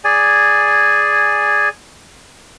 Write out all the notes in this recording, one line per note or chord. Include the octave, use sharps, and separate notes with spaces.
G#4 D5 G#5